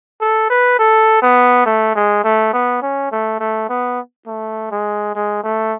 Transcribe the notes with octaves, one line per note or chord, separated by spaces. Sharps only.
A4
B4
A4
B3
A3
G#3
A3
B3
C#4
A3
A3
B3
A3
G#3
G#3
A3